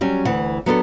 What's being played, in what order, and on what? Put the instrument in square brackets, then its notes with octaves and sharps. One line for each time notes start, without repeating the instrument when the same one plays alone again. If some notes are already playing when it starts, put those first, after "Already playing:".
[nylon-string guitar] F#3 G3 C#4
D2 E3 F#5
F#3 B3 D4 A4